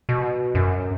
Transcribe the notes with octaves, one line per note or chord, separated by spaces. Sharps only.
B2
F#2